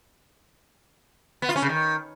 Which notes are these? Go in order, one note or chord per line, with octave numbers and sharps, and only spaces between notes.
B3
F4
C#4
C#3
D#3